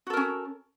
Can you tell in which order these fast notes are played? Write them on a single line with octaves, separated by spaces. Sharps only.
F#4 A4 A#4 C#4